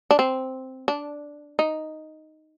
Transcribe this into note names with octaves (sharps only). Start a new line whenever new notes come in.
D4
C4
D4
D#4